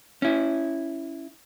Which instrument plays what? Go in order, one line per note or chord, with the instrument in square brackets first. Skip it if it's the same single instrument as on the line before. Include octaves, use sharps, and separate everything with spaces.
[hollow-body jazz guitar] C#4 E4